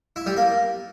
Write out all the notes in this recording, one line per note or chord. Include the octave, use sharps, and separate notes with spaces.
E4
G3
A#3